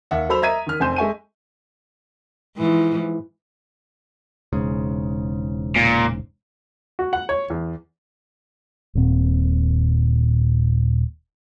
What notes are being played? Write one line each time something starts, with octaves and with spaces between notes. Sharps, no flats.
D#2 E5 F#5
F#3 A4 C5 B5 E6 F7
D#5 E5 A#5 G#6 B6 D#7
D#3 F6
F1 C4 G#5 C6 G6 E7
G#3 A4 E5 G#5 C#6 D#7
G#2 E3 F3
E1 G#2 C#3
A#2
F#4
F#5
C#5
E2
D#1 A#2 C4